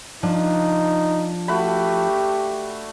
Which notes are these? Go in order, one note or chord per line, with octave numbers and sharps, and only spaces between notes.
F3 D4 D#4
A3 F#4 G4 B5